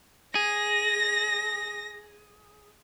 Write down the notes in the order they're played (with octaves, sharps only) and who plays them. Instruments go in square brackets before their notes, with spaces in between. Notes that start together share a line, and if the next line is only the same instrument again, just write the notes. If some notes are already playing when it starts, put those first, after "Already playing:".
[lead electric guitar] G#4 [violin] A#6